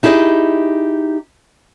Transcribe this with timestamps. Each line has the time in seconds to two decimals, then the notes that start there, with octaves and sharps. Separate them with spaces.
0.03 D#4 E4 G4 G#4 D5 D#5